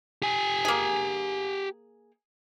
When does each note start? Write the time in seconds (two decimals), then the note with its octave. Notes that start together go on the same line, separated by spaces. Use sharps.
0.22 G4 G#5
0.65 A#3 G#4